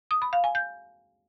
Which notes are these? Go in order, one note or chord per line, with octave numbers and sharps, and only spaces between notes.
D#6
B5
F5
G#5
G6